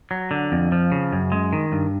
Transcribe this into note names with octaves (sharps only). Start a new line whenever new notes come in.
F#3
D3
F2
F3
C#3
F#2
G#3
D#3
G2